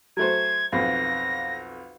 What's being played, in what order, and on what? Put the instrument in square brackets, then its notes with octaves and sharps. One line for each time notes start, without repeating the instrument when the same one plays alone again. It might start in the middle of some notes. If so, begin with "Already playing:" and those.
[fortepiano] F#3 A3 C5 [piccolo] G#6
[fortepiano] B1 F2 F5 [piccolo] A#6